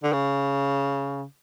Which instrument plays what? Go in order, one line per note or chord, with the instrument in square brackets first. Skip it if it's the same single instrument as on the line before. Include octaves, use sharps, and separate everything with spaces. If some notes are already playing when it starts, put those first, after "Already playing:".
[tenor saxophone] D3
C#3